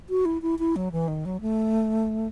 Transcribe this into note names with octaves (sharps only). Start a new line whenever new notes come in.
F#4
E4
E4
E4
F#3
E3
D#3
F#3
A3